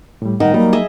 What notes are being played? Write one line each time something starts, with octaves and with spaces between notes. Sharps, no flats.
A2 G3
D#3 D#4 F#5
F#3 G3 A#3
G#4 D#5 E5